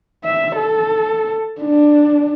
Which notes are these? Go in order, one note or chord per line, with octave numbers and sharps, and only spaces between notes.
E5
A4
D4